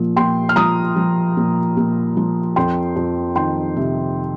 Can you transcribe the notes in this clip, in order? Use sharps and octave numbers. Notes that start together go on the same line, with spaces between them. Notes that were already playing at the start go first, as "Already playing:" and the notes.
Already playing: A#2 F3
A#2 G5 C6
F6
F3 A#5 D#6
F3
A#2
A#2
F3
F2 G5 C6
F2
D#3 G5 C6
C3